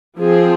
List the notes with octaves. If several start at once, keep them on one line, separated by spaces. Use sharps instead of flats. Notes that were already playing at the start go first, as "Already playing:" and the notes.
F3 C4 G#4